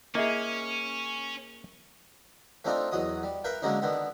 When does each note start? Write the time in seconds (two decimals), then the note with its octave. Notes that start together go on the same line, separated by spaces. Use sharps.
0.15 A#3 C#4 E4 G#4 D#5 E5
2.65 A3 C4 D4 D#4 F4 A4
2.92 E2 F#3 D#5 D#6
3.23 G3
3.44 A#4 B4 E5 F5 G5
3.62 D3 F#3 G#3 A#3 C#4 D#4
3.82 D3 D#3 B3